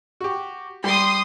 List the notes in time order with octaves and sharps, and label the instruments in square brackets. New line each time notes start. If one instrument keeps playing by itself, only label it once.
[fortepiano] F#4 G4
[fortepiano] G3 [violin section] C6 D#6